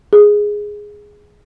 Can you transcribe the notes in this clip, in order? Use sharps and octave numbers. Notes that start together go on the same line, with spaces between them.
G#4